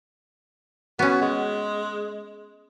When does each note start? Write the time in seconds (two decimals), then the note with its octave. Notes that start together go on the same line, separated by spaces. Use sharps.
0.99 B3 C#4 F#4
1.22 G#3